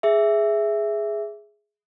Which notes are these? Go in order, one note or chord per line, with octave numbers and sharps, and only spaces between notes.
G#4 E5